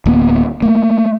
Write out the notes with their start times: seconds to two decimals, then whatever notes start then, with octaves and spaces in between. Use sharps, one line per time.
0.06 D1 A#3 B3
0.62 A3 A#3